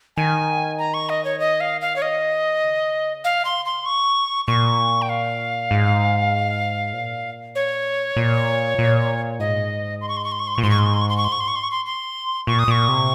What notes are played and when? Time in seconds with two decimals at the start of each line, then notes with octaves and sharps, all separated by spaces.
0.17 D#3 G#5
0.79 A#5
0.94 C#6
1.09 D#5
1.25 C#5
1.40 D#5
1.60 F5
1.81 F5
1.96 C#5
2.02 D#5
2.63 C#3
3.24 F5
3.45 C6
3.66 C6
3.86 A#2 C#6
4.47 A#2 C#6
5.02 G5
5.09 F5
5.71 G#2
6.93 A#2
7.55 C#5
8.16 A#2
8.78 A#2
9.39 G#2 D#5
10.01 C6
10.09 C#6
10.17 C6
10.25 C#6
10.32 C6
10.39 C#6
10.47 C6
10.55 A#2 C#6
10.63 G#2 C6
10.70 C#6
10.79 C6
10.86 C#6
10.94 C6
11.01 C#6
11.09 C6
11.17 C#6
11.24 C6
11.32 C#6
11.40 C6
11.48 C#6
11.56 C6
11.63 C#6
11.71 C6
11.86 C6
12.47 A#2 C#6
12.59 D#6
12.68 A#2 C#6
12.88 C3